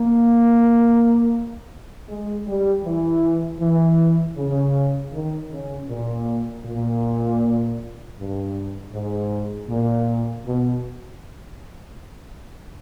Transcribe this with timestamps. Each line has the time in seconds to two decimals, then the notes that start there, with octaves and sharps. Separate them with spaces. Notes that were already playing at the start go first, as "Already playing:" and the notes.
Already playing: A#3
2.09 G#3
2.46 G3
2.85 E3
3.61 E3
4.37 C#3
5.13 D#3
5.52 C#3
5.89 A#2
6.66 A#2
8.18 G2
8.93 G#2
9.69 A#2
10.46 B2